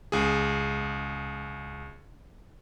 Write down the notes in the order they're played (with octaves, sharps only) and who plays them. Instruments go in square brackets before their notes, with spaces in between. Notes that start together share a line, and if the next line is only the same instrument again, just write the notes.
[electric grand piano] C#2 G#4